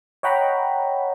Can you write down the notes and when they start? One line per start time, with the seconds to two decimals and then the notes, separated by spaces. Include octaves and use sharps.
0.23 C#5 D#5 F#5 G5 A#5 B5